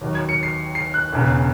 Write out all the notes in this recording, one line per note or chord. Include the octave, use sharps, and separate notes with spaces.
D#2 D#3 F#3
G#6
C#7
C7
C7
F#6
E1 E2 C#3